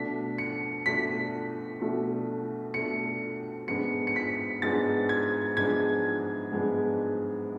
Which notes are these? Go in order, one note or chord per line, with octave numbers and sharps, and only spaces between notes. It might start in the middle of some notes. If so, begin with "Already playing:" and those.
Already playing: B2 A3 D4 B6
C#7
B2 A3 D4 B6
B2 A3 D4
B2 A3 D4 C#7
G#2 G#3 B3 D4 C#7
C#7
B6
G#2 G#3 B3 D4 A6
G#6
G#2 G#3 B3 D4 G#6
G#2 G#3 B3 D4